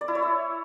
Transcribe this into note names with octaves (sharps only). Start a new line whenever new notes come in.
D5
E4
C#5
E5